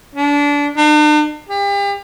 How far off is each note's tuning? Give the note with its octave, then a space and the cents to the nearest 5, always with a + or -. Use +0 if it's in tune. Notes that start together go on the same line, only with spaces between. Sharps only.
D4 -25
D4 +45
G4 +40